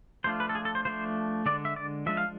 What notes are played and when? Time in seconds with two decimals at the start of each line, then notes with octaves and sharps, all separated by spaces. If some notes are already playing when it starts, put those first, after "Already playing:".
0.24 F3 A3 D4 F4 C5
0.40 B4
0.49 A4
0.55 G#4
0.65 A4
0.75 C5
0.85 F3 A3 D4 C5
1.46 D3 G#3 D4 D5
1.65 E5
1.76 D5
2.06 F3 G#3 D4 E5
2.17 F5